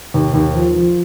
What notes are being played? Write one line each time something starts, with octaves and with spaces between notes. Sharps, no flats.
D#2
D#2
F3
F3